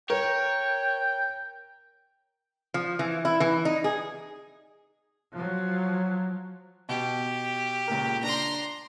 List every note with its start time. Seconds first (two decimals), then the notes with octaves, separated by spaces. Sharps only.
0.10 A#4 C#5 G5
2.74 F3
2.99 E3
3.25 E4
3.40 E3
3.65 D#4
3.84 G#4
5.33 F3 F#3
6.89 B2 G4
7.87 C#2 A#2 A#4
8.24 D4 A#5 C6